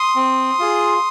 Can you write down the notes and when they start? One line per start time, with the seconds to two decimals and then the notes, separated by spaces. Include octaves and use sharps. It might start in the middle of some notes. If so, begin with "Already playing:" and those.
Already playing: C6 D#6
0.16 C4
0.59 F4 G#4